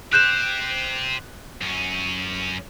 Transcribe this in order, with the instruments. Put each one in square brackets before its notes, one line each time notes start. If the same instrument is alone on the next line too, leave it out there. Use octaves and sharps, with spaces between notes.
[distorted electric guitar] G4 C5 [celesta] F#6 G6 E7
[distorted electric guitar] F#2 C#4